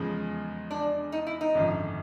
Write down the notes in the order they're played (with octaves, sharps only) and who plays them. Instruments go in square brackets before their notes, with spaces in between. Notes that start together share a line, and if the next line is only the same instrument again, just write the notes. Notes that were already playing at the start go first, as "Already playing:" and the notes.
Already playing: [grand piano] E2 C#3 F3 G#3
[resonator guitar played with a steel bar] D4
D#4
E4
D#4
[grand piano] G#1 F#2 D3 F3